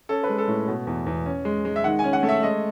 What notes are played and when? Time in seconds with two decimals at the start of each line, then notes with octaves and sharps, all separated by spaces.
0.09 C#4 A4
0.24 B4
0.29 G#3
0.38 A4
0.48 A2
0.68 B2
0.87 E2
1.06 E2
1.26 C#4
1.45 G#3
1.65 G#3
1.76 E5
1.84 D#3 F#5
1.99 G#5
2.04 C#4
2.13 F#5
2.23 A3
2.29 E5
2.43 G#3 D#5